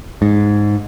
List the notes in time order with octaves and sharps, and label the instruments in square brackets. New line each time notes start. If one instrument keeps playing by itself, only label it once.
[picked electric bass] G#2